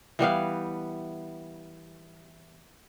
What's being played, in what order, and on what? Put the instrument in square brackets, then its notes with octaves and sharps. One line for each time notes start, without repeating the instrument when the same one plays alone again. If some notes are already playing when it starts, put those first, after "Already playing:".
[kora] E3 G3 B3 F5